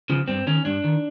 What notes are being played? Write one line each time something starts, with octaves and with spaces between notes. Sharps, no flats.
C#3 F3
G2 C4
D#3 C#4
G2 D4
D#3